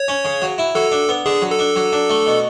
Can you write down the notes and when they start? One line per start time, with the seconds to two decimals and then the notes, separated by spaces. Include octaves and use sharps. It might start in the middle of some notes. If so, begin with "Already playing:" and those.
Already playing: C#5
0.08 C#4
0.25 C#3
0.42 F#3
0.58 E4
0.75 F#3 A4
0.92 D4
1.09 B3
1.26 D3 G#4
1.42 F#3
1.51 A4
1.59 D4
1.76 F#3
1.92 D4
2.10 A3
2.27 B2